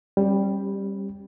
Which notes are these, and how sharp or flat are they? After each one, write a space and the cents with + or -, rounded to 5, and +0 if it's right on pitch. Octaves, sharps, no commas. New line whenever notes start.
G3 +5 C#4 -40